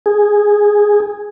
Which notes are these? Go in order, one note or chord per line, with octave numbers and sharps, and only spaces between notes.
G#4